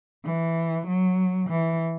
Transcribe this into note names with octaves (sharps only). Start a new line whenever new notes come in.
E3
F#3
E3